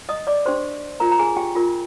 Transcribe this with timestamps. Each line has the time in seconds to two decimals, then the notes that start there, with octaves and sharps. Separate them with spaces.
0.09 D#5 D#6
0.27 D5 D6
0.46 D4 G4 C5 C6
1.00 F4 A#4 A#5
1.12 A#5
1.19 G#4 G#5
1.37 G4 G5
1.55 F4 A#4